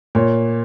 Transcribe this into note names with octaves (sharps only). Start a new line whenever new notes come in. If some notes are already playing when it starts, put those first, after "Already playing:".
A#2 C#5